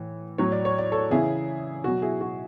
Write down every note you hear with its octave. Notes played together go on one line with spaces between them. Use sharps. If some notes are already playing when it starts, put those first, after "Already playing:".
Already playing: A2 E3
A2 F#3 C#5
D5
C#5
D5
A4 C#5
C#3 E3 E4 G#4
B2 F#3 F#4
E4 G#4
F#4